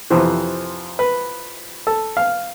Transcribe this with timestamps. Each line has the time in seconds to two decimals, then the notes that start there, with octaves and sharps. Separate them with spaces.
0.10 F2 C3 E3 C5
0.99 B4
1.87 A4
2.17 F5